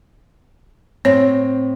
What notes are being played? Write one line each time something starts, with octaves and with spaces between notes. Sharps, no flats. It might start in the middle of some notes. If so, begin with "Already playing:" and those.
A2 C4 C#5